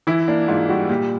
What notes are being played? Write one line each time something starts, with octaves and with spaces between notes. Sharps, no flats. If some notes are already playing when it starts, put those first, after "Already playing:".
E3 E4
A#3 D4
G#2 F4
G3 F#4
A#2 G4